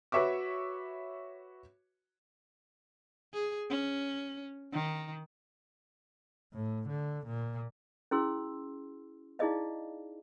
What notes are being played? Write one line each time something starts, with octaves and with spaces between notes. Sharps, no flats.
F#4 B4 C#5 E5 C#6 D6
G#4
C#4
D#3
A2
D3
A#2
C#4 E4 F#4 G#4 C6 E6
D#4 E4 G#4 D5 D#5 F5